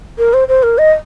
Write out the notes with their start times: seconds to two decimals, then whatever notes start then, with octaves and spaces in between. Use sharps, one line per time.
0.18 A#4
0.33 C5
0.48 C5
0.63 A#4
0.78 D#5